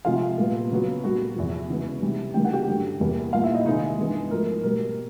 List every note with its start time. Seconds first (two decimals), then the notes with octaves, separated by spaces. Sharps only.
0.05 C3 F3 G#3 F4 F5
0.38 A#2 G3 B3
0.71 C#3 F#3 B3
1.04 A#2 G3 A#3 F#4 F#5
1.36 E2 C3 F3
1.70 C#3 E3 G#3 B3
2.02 C3 E3 G3
2.34 C#3 E3 G3 A#3 G5
2.44 F#5
2.53 G4 G5
2.67 G2 D3 F#3
3.00 E2 C3 E3 G3 A#3
3.33 A#2 G3 A#3 F4 F5
3.43 E4 E5
3.55 D#4 D#5
3.65 C3 D#3 G#3 D#4 D#5
3.98 G2 E3 G#3 B3
4.31 G#2 F3 A3 A#4
4.63 B2 G3 A#3 A#4